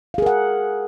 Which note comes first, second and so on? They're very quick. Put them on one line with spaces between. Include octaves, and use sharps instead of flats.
F5 G#4 A#4 F#5